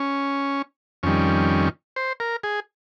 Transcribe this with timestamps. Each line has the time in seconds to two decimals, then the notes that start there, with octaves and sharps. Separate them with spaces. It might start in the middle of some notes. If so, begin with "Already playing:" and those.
Already playing: C#4
1.03 F2 D#3 G3 C#4
1.96 C5
2.20 A#4
2.43 G#4